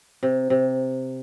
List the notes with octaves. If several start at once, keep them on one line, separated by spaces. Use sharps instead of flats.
C3
C3